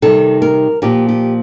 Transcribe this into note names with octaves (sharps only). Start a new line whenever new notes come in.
C3 D#3 G3 A4
A#4
A#2 F3 G4
G4